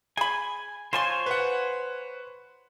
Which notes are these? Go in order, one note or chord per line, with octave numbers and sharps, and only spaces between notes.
G#4 G#5 B5
F3 C5 C#5 G#5 A5 C6
B4 F#5